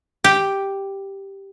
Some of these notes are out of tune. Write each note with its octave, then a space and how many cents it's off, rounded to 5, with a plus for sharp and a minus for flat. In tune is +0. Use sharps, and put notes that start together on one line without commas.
G4 +0 G5 +0